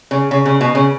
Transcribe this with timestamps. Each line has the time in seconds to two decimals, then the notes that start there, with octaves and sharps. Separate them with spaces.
0.11 C#3
0.31 C#3
0.45 C#3
0.61 B2
0.75 C#3